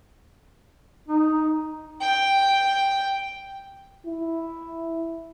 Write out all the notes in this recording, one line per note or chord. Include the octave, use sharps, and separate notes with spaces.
D#4
G5
E4